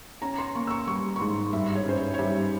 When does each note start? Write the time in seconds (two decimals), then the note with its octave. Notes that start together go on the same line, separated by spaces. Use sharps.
0.22 C#4 A#5
0.38 C6
0.55 A#3 C#6
0.67 E6
0.70 C#6
0.87 G3 C#6
1.16 C#6
1.20 G#2 C6
1.53 G2 E5
1.75 C#5
1.85 C#4 C5
1.97 C#5
2.14 C#5
2.18 G3 E5